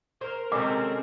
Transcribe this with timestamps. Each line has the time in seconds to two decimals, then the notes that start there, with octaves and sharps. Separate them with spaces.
0.21 A#4 C5
0.52 C3 D#3 G#3 C4 C#4 A4 A#4 D6